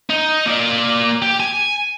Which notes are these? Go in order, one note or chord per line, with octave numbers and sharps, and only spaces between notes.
D#4
A#3 D5
G4
G#5